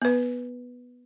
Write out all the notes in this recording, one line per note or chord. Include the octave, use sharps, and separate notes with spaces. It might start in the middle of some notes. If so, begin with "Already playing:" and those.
B3 B4